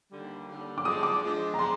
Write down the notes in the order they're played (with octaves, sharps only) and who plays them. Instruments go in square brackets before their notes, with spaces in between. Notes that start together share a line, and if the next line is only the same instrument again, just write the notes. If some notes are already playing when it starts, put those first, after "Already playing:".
[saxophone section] D#2 D3 G3
D#2 D3 G3
[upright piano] D6
[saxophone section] F3 G#3 D4 [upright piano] D#6
[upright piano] D6
[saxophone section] F3 G#3 D4
[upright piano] A#5
[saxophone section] F3 G#3 D4 [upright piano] C6